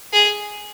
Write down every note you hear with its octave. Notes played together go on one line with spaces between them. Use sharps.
G#4